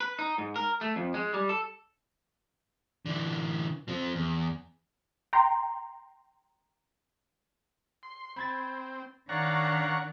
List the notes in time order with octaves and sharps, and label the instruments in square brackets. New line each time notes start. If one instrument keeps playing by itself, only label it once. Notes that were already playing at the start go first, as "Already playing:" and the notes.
[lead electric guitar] B4
D#4
G#2
A#4
A3
F2
G#3
G3
A4
D3 E3
F3 C4
E2
[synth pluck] G5 A#5 C6
[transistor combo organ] C6
[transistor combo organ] C4 [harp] B5 G#6 A6
[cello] D#3 D4 [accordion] C#5 D5 F5 [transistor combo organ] F#5 A#5 C#6